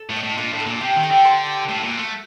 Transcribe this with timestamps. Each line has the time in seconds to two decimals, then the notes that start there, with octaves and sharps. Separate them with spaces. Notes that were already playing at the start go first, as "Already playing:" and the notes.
Already playing: A4
0.09 A2
0.16 D#5
0.23 A2
0.37 A#2 D4
0.53 A2
0.60 A4
0.66 A#2
0.81 C3 G4
0.96 D#3
1.03 G5
1.11 D3
1.25 C5
1.46 G4
1.68 A2 A4
1.83 A#2
1.91 F#4
1.98 A3